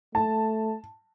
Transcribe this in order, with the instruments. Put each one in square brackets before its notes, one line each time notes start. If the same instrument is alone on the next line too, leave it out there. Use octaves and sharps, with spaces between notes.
[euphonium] A3 [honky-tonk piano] A5